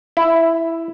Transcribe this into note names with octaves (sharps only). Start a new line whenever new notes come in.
E4